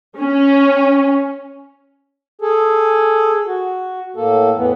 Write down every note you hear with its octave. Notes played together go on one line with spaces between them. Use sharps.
C#4
G#4 A4
F#4
A2 A#3 A4
E2 A2 E3 B3